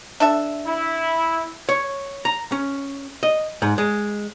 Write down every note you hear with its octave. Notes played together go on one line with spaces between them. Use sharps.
D4 A4 E5
E4
C#5
A#5
C#4
D#5
G#2
G#3